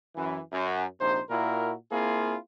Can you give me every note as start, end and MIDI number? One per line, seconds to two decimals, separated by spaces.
0.16 0.38 42
0.16 0.38 52
0.52 0.84 42
1.00 1.19 34
1.00 1.19 48
1.00 1.19 63
1.00 1.19 72
1.30 1.73 46
1.30 1.73 64
1.30 1.73 66
1.30 1.73 70
1.92 2.35 58
1.92 2.35 60
1.92 2.35 64
1.92 2.35 65
1.92 2.35 68